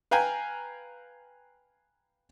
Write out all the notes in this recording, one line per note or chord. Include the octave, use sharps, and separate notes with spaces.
B4 F5 G5 G#5 A#5